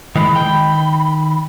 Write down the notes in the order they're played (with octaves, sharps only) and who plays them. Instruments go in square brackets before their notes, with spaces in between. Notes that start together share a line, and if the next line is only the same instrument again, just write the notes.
[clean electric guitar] D#3 E3 G#3 [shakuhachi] B5
[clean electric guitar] D#3 G5